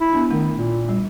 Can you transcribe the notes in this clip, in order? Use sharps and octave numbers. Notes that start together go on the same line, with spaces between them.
E4
B3 D4
D#3 A3
A#2
G3